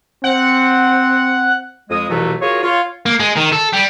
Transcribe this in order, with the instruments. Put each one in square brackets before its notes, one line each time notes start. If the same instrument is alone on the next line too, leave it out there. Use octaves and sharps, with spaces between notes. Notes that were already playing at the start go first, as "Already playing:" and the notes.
[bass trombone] C4 [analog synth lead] F#5
[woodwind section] F2 G#3 D#6
C2 F2 B2 E3 F#3 A3
F#3 F4 G#4 A#4 C#5
F4 C#5
[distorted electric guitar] A#3
G#3
D#3
A4
G3